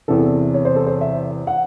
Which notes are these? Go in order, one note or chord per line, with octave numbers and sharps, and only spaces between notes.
E2 C3 E3 A4
C#5
C5
A4
C5
E5
F#5